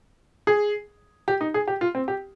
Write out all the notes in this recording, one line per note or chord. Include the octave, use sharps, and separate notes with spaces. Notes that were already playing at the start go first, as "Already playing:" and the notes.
G#4
G4
D#4
G#4
G4
F4
C4
G4